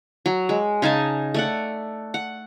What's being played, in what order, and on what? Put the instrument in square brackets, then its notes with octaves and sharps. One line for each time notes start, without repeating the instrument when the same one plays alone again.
[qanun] F#3
G#3
C#3 D#4 G#5 A5
A3 D5 F#5
F#5